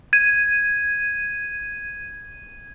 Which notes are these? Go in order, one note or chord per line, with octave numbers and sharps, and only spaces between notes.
G#6 D#7